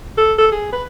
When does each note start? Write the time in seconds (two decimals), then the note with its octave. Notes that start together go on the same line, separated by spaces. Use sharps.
0.17 A4
0.38 A4
0.52 G#4
0.72 B4